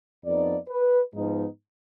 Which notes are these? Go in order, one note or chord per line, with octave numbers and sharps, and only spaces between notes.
F2 F3 B3 D#4 D5
B4
G#2 F3 B3 D#4